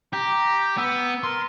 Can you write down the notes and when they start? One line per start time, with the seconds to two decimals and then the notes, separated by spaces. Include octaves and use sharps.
0.13 G4 A#5
0.78 B3 E6
1.24 A#4 C6